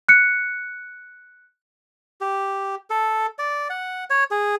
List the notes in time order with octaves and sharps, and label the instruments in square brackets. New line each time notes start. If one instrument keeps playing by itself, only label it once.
[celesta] F#6 C#7
[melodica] G4
A4
D5
F#5
C#5
G#4